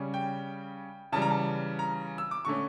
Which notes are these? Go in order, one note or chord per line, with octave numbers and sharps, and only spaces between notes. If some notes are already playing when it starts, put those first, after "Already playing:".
Already playing: C#3 G3 C#4
G5
C#3 E3 G3 A5
A#5
A5
A#5
E6
D6
D3 A3 C#4 C#6